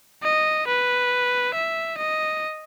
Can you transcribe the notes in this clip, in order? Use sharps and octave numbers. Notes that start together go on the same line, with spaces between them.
D#5
B4
E5
D#5